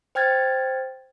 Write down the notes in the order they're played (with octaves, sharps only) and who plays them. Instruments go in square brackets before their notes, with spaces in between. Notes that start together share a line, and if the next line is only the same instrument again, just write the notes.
[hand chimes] C5 G5 F6 G#6 A6